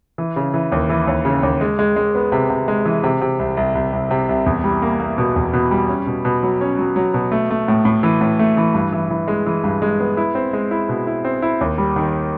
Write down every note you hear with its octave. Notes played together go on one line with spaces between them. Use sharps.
E3
C#3
E3
D#2
E3
D#2
C#3
D#2
G#3
G#3
G#3
B3
C3
C3
G#3
E3
C3
C3
C2
C2
C2
C2
C3
C2
E2
G3
A#3
A#3
B2
E2
B2
G3
C#4
B2
B2
F#3
C#4
F#3
F#3
B2
A3
A3
A2
A2
E3
A2
A3
E3
G2
E3
E3
G#3
E3
G2
G#3
B3
E4
C4
G#3
E4
B2
E4
C4
E4
D#2
G3
D#3